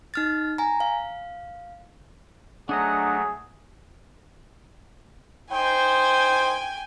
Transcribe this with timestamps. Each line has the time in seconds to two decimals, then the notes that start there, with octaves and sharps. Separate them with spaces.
0.14 D#4 F6 A6
0.58 G#5 A#5
0.80 F5
2.69 F#3 A3 D4 G#4 D#5 F#5 A#5
5.51 D#4 C5 G5 G#5